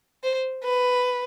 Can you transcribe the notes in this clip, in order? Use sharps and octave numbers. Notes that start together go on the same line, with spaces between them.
C5
B4